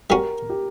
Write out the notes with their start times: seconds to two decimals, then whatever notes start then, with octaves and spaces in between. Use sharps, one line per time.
0.10 G3 C#4 F#4 A#4
0.50 G4